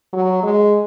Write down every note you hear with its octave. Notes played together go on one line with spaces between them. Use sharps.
F#3
G#3